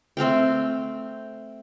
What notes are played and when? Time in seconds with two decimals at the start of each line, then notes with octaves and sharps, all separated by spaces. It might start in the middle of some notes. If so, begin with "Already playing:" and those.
0.17 A3 C4 F5 G5